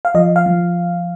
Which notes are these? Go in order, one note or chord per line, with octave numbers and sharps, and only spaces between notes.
F5
F3 D#5
F5
F3